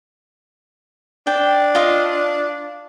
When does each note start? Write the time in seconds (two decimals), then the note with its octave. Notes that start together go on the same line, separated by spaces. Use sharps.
1.27 D4 G5
1.75 F4 D#5 F5